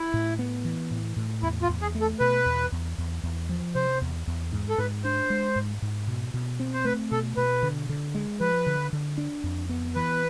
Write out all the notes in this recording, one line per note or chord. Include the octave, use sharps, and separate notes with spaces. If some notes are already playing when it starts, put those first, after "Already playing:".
Already playing: E4
A2
B3
E3
A2
A2
E2 E4
F4
E2
G#4
A3
A4
B2 B4
E2
E2
E2
E2
F3
C3 C5
E2
E2
G#2
A4
G#2 B4
D4 C5
G#3
G#2
G#2
B2
B2
C4
C5
A3 B4
B2 A4
B2 B4
D3
D3
G#3
F3 B4
D3
D3
D4
F2
B3
E3 B4